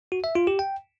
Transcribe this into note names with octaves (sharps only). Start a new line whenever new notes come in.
F#4
E5
F4
G4
G5